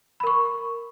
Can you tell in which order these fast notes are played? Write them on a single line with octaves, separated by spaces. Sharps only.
B5 A#4 C#6